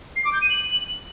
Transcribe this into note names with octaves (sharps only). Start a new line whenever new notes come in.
C7
D6
G6
D#7
F#7